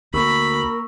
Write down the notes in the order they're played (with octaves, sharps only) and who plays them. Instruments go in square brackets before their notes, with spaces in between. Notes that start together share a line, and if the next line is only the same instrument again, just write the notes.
[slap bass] D2 [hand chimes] A#3 C#6 E6 [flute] A#4 [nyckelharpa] B5